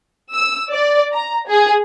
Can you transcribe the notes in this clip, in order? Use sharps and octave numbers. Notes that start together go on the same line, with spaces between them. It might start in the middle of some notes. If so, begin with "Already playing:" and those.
E6
D5
A#5
G#4